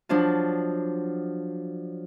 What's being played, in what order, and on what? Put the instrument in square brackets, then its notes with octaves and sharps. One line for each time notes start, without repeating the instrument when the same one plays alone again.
[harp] F3 F#3 D4 F4